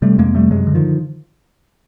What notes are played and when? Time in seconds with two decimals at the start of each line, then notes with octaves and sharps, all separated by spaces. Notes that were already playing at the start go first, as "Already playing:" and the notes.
0.02 C3 G3 A3
0.18 F2 G#3 A#3
0.34 C3 G3 A3
0.51 F#2 F#3 G#3
0.67 D3
0.75 D#3 F3